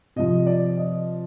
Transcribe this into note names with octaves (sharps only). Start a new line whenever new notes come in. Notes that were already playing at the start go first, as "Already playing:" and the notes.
C3 F3 D#5
D5
D#5